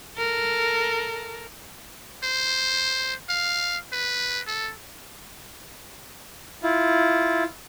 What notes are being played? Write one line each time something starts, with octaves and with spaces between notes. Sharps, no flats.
A4 A#4
C5
F5
B4
A4
E4 F4